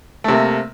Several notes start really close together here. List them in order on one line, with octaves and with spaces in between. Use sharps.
A3 C3 A#3